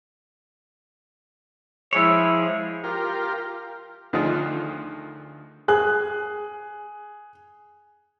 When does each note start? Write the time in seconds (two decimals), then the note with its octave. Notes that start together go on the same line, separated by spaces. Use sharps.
1.93 F3 G#3 E4 G#4 C#5
2.84 F4 G4 A#4
4.13 D2 D#3 F3 D#4 F4 G#4
5.68 G#4 F#6